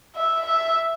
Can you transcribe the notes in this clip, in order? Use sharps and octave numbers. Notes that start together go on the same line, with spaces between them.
E5
E5